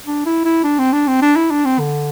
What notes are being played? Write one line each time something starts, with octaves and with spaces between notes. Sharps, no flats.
D4
E4
E4
D4
C4
D4
C4
D4
E4
D4
C4
D3